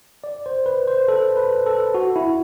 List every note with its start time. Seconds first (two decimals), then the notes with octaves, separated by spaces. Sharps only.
0.24 D5
0.46 C5
0.66 B4
0.88 C5
1.08 A4
1.37 B4
1.66 A4
1.94 F#4
2.16 E4